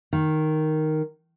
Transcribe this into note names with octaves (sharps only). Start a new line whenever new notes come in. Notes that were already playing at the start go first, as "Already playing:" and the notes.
D#3